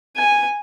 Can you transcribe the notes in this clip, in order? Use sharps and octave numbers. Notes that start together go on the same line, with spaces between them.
G#5